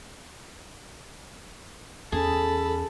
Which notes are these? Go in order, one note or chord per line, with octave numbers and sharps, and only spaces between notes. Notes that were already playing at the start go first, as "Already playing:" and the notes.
E2 A#3 C#4 G#4 A4 A5 B5